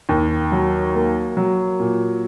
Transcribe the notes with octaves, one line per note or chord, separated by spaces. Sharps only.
D#2
F#3
A#3
F#3
A#2